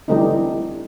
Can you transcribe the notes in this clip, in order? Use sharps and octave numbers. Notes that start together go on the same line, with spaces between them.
D3 E3 G3 A3 C4 D#4